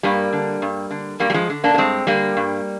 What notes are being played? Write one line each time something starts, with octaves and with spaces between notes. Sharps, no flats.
G2 G3 A#3
D3
G2
D3
G2 G3 A#3
G3
F3 G#3
D3
A#3 D4
A#3
G2 G#3 C4
D3 G3 A#3
G2